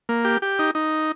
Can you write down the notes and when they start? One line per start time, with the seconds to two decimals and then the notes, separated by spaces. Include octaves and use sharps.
0.09 A#3
0.25 G4
0.42 G4
0.59 D#4
0.75 D#4